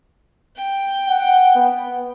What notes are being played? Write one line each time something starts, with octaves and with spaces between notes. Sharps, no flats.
G5
F#5
B3